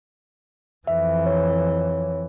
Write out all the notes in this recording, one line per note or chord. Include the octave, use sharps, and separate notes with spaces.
F2 E3 E5
C#5